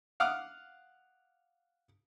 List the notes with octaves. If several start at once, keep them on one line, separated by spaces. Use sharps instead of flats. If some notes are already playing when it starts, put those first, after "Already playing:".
F5 F#5 D6 D#6 F6